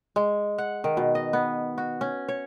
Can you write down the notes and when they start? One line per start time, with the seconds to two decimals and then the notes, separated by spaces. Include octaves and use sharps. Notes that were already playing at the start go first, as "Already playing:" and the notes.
0.16 G#3
0.58 F#5
0.84 D#3
0.97 B2
1.15 D#5
1.33 B3
1.78 F#4
2.01 C#4
2.28 C#5